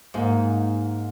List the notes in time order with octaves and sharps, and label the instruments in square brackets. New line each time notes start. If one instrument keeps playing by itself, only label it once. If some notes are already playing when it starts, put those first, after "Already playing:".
[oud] G#2 [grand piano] A#3